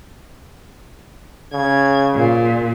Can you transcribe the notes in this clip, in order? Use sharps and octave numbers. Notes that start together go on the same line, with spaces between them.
C#3 G#6
A#2